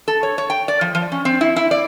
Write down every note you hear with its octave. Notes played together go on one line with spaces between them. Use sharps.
A4
C#5
C#5
G5
D5
F3
F3
C#4
C4
E4
E4
D5